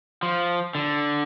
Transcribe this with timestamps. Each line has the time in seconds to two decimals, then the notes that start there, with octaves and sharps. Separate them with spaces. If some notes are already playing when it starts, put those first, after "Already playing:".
0.23 F3
0.75 D3